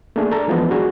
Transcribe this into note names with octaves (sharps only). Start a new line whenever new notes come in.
A3 A#3 D4 G#4
A4 D5 A#5
E3 F3 G#3 B3
D4 F#4 G#4